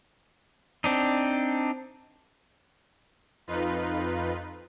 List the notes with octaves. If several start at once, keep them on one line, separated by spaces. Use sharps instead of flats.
C4 D4 D#4
F2 D#4 F4 B4